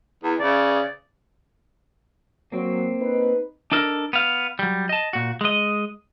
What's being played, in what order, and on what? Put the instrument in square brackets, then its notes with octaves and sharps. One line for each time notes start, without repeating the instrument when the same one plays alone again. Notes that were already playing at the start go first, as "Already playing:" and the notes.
[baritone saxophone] E2
[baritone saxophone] C#3 [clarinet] D5
[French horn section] F#3 [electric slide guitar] A#3 C4
[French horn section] D#4 B4
[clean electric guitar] D4 D#4 A4 A#4
B3 F5
F#3 G3
D#5 A5
A#2 F#4
G#3 D#5